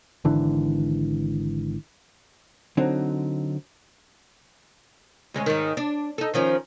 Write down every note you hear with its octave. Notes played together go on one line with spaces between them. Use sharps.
G#1 D3 E3
D3 F#3 C4 D#4
D2 G#3 C#4
G#2 D#3
D4
D#4 A4
D#3 F3 C#4